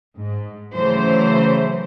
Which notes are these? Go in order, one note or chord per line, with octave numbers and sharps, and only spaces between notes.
G#2
C#3 E3 F#3 A3 C5